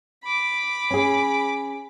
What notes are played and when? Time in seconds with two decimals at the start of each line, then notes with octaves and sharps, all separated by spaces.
0.23 B5 D6
0.91 C#4 G#4